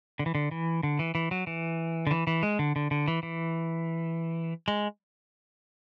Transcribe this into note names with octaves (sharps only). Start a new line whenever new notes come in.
D3
E3
D3
E3
D3
E3
E3
F#3
E3
D3
E3
E3
G#3
D3
D3
D3
E3
E3
G#3